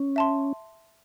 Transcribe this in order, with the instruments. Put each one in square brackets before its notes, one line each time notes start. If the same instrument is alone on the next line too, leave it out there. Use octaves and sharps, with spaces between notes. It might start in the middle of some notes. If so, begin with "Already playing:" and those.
Already playing: [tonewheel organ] C#4
[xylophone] E5 A5 C6